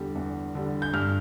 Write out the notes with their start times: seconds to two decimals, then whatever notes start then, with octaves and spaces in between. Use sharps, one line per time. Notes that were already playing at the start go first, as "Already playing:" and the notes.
Already playing: E2 D3 G3
0.15 E2
0.55 D3 G3
0.82 G6
0.94 G2 F6